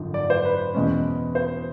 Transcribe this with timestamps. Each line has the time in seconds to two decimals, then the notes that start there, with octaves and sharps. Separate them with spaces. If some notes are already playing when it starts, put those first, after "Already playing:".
Already playing: G#1 F#2 D3 F3
0.14 D5
0.30 C5
0.45 B4
0.74 E2 B2 G#3 C#4
1.35 C5